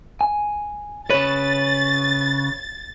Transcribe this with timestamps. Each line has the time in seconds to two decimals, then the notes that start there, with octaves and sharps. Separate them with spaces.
0.21 G#5
1.10 C#3 B4 C#5 A6